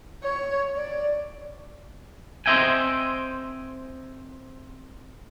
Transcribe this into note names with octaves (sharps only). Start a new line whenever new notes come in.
C#5
D5
C4 C5 D#5 E5 G5 G#5